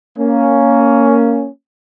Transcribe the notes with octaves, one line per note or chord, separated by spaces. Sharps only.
A#3 C#4